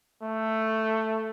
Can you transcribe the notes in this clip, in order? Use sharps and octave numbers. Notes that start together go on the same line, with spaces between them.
A3